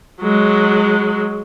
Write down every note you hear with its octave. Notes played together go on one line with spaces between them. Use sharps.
F#3 G#3